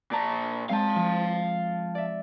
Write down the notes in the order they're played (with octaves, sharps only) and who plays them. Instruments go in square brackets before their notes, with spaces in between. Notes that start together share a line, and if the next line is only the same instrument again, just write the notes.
[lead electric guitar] A#2 A5 [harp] D5 A#5
[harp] G#3 C4 [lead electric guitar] F5 A5
[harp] F3
D5 E5